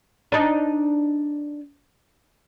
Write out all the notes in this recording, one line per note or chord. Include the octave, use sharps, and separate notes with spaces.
D4 D#4